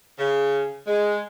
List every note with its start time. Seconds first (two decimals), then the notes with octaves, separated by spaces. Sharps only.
0.17 C#3
0.86 G#3